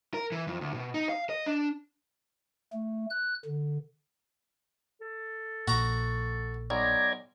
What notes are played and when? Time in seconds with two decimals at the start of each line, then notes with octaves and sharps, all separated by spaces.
0.14 A#4
0.32 E3
0.47 F2
0.61 D2
0.74 B2
0.94 D#4
1.09 F5
1.30 D#5
1.46 D4
2.73 A3
3.10 F#6
3.45 D3
5.01 A4
5.68 A#1 A#2 F#4 A#5
6.70 B1 D5 A#5 G#6